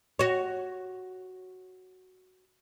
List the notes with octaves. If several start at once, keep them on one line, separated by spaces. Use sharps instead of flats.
F#4 C#5